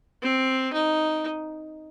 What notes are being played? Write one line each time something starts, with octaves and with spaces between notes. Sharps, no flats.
C4
D#4